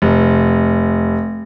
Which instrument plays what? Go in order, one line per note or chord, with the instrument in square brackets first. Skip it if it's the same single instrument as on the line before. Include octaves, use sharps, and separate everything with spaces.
[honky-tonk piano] F1